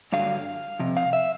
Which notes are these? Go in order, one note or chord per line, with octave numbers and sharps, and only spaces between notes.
G2 D3 F#3 F5
F2 C3
F5
E5